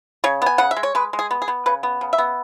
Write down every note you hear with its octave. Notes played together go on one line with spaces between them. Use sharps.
C#3 C#5
B3 G#5
C#3 F#5
E5
G#3
C#5
G#3 B4
G#3
G#4
B3
G#4
B3
C#3 B4
B3
C#3
E5
B3